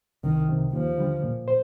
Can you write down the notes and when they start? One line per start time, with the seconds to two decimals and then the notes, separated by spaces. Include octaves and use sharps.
0.24 C2 D#3
0.49 C3 D#3
0.73 D#2 F3
0.98 D3 G3
1.23 A#2
1.48 C5